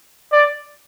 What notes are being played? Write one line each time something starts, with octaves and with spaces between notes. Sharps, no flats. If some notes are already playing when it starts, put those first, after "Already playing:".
D5